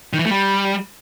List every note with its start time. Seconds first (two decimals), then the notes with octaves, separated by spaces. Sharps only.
0.13 D#3
0.19 E3
0.25 A3
0.31 G3